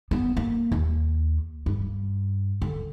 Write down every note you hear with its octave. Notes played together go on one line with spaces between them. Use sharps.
B3
A#3
D#2
G2
D3